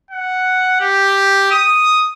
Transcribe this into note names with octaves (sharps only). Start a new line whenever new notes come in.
F#5
G4
D#6